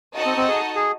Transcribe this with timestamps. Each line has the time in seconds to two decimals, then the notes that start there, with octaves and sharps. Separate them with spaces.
0.15 D#4 F#4 A4 D#5 A5
0.26 C4
0.37 C4
0.49 G#4
0.76 G#4